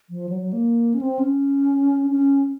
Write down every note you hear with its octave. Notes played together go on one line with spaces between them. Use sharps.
F3
F#3
F#3
A#3
C#4
C4
C#4
C#4